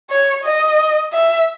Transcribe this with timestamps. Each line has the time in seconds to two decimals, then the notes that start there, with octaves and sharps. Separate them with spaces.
0.10 C#5
0.44 D#5
1.13 E5